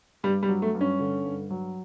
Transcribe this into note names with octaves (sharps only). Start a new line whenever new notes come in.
G2 G3
G3
F#3
A3
G2
C#4
D3
G2
F#3